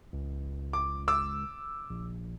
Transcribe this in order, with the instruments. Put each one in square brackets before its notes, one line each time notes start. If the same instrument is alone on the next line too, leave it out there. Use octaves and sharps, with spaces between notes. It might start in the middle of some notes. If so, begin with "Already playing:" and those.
[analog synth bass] C#2
[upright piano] D6
D6 E6
[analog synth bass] A#1